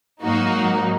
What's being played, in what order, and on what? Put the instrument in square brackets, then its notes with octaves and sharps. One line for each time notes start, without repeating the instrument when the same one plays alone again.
[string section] G#2 F#3 A#3 D#4 F#4